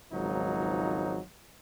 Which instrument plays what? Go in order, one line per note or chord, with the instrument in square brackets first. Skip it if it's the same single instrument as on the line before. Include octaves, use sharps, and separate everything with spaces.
[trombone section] G#1 C#2 F3 F#3 D#4